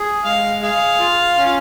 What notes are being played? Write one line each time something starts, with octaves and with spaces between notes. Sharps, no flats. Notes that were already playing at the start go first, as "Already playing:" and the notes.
Already playing: G#4
G#3 F5
G#4 F5
F4
C#4